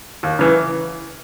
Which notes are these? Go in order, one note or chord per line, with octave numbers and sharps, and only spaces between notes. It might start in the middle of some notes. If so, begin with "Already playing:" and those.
D#2
C#3 E3